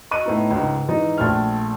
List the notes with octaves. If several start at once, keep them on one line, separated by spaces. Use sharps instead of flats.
D#5 C#6 F#6 D#7
A2 B3 D#4
C#2 G#2
G#2 E3 D#4
A#1 A3 F6